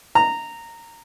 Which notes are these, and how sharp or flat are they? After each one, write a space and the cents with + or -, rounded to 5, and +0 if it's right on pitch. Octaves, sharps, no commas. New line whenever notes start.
A#5 -15